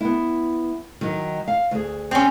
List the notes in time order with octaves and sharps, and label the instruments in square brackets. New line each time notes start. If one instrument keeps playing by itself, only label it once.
[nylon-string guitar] B3 E4
D#3 F#3
F5
D2 G#4
[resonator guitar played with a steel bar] C4 C#4